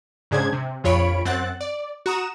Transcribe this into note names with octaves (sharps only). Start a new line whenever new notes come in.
G#2 C#3 D4 G#4 C5 G#6
C3
A#1 F2 F4 C#5 B5 D7
F#2 C4 F#5 F#6 A6
D5
F#4 A#5 D#6 E7